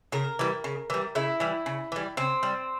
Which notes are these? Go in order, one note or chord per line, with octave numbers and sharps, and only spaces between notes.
C#3 A#4
E3 G3
C#3
E3 G3
C#3 E4
E3 G3
C#3
E3 G3
C#3 C4
G3